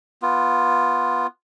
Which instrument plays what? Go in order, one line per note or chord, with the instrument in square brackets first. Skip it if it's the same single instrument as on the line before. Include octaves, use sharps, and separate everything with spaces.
[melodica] B3 F4